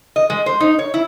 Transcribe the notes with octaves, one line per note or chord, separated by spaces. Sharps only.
D#5
G#3
C5
D#4
C#5
E4